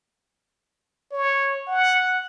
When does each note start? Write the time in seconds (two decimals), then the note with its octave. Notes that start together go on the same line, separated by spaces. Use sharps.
1.12 C#5
1.67 F#5